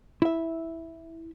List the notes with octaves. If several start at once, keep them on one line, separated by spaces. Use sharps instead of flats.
E4 E5